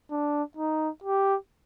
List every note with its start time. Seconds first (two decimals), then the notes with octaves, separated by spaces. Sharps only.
0.11 D4
0.57 D#4
1.04 G4